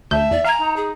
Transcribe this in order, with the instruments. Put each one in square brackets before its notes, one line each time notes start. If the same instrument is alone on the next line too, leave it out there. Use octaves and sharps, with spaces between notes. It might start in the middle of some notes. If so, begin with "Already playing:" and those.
[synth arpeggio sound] D2 G6 [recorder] E5 [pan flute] A5
[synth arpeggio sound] E2 [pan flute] D5
[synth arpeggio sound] F5 G#5 [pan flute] A#5
[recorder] D#4
[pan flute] G#4